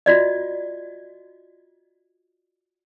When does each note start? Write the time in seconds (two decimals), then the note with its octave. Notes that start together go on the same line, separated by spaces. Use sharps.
0.06 F4 F#4 D5 D#5